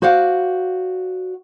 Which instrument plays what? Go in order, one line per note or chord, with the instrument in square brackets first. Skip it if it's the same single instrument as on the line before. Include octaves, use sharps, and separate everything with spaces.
[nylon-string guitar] F#4 C5 D5 F5 F#5